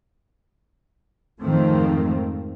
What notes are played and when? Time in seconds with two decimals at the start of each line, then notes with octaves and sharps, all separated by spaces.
1.40 F2 G#2 D#3 F3 A3 C4